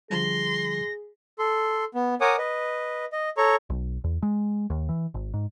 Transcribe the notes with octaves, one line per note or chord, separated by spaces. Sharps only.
D3 F3 G3 G#4 C6 A#6
A4 C6
B3
A#4 C#5 F#5 G#5 D6 D#6
B4 D#5
D#5
A4 C#5 A#5 C#6
B1
E2
G#3
D#2
E3
G#1
G#2